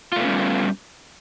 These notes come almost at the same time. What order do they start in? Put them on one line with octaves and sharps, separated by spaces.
F4 A3 B3 C#4 G3